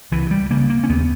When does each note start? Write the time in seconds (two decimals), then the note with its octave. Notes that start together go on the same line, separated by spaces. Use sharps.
0.12 C#2 E3
0.31 G3
0.51 C#3 A#3
0.70 A#3
0.84 C#4
0.89 D#2 B3